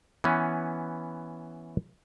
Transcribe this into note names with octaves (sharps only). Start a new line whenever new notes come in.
E3 B3 C#4